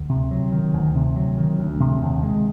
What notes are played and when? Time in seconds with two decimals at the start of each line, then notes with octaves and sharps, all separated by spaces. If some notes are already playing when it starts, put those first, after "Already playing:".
Already playing: D2
0.09 C3
0.31 F#3
0.52 D#3
0.74 D2
0.95 C3
1.16 F#3
1.38 D#3
1.59 D2
1.80 C3
2.02 D#2
2.23 G#3